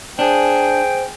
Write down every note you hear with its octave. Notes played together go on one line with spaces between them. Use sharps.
D4 G#4 C5 G5